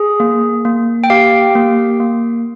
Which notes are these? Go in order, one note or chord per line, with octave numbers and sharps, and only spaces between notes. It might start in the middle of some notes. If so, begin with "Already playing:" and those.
Already playing: G#4
A#3
A#3
G5
G4 F5
A#3
A#3